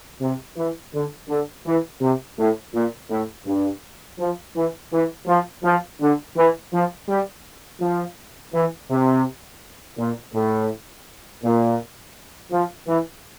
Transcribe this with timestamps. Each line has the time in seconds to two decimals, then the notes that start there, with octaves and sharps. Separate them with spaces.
0.21 C3
0.56 E3
0.93 D3
1.29 D3
1.66 E3
2.01 C3
2.38 A2
2.74 A#2
3.10 A2
3.46 G2
4.19 F3
4.55 E3
4.92 E3
5.27 F3
5.64 F3
6.01 D3
6.36 E3
6.73 F3
7.08 G3
7.81 F3
8.53 E3
8.90 C3
9.98 A#2
10.34 A2
11.43 A#2
12.51 F3
12.87 E3